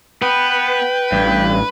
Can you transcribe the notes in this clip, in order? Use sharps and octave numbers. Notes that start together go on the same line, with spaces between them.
B3 B4 G5
A1 G2